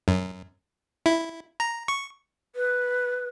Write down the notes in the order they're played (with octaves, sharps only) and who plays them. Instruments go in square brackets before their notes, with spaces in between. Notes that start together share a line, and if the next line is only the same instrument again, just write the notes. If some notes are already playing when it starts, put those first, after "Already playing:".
[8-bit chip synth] F#2
E4
A#5
C#6
[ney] B4